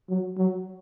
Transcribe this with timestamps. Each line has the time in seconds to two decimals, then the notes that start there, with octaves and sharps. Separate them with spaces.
0.09 F#3
0.37 F#3